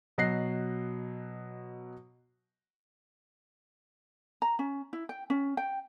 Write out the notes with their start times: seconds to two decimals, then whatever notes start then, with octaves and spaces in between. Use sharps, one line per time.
0.18 B2 F#3 D#5 F#6 A#6 C7
4.42 A#5
4.59 C#4
4.93 E4
5.09 G5
5.30 C#4
5.57 G5